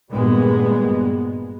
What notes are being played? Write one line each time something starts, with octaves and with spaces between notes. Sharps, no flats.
G#1 G2 A#2 G3 G#3 B3